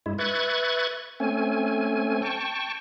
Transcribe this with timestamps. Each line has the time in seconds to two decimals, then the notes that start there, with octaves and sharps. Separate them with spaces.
0.06 G2 G#3 E4
0.18 B4 E5 C#6 F#6 G#6 A6
1.20 A3 C4 C#4 G#5
2.22 G5 A5 C#6